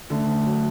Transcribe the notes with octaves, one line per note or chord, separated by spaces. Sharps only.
D3 A3
F#3